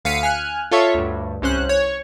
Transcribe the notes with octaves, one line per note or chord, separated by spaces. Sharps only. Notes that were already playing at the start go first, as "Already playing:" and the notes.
D2 F5 B6 C#7 D#7
G#5 F6 F#6
F4 A4 C#5 E5
D2 G2
C2 C#4 C5 F#6
C#5